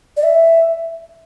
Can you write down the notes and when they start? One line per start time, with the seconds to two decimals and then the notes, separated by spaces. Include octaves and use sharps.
0.17 D5
0.23 E5